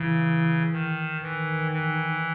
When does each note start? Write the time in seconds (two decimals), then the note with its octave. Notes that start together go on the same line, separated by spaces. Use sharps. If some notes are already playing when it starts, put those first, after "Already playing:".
Already playing: C#3 E3
0.73 D#3
1.23 D#3 E3
1.73 E3